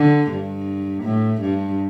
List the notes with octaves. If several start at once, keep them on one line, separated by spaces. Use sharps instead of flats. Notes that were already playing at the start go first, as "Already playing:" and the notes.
Already playing: D3
G2
A2
G2